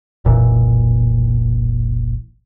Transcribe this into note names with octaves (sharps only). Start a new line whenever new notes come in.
F1 B1 A#2 E3